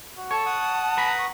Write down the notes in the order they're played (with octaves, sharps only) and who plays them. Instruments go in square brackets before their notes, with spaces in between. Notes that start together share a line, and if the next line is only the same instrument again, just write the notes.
[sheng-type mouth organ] F#4
[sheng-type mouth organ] A4 [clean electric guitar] C#5 [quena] A5
[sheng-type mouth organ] F#5 D#6
[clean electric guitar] B4 A#5 B5
[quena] C#6